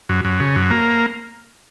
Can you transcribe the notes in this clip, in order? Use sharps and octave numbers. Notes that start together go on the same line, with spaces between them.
F#2
F#2
C#3
F#2
A#3